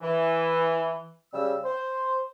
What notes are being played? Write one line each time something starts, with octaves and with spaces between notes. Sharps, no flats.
E3
C#3 G3 E6
C5